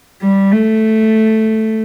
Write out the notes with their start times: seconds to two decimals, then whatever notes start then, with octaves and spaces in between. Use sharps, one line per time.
0.22 G3
0.52 A3